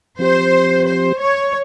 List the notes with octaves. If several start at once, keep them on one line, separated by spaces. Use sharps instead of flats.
F3 C4 G4 C5
C5
C#5